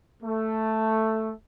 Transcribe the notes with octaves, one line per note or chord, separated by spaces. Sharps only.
A3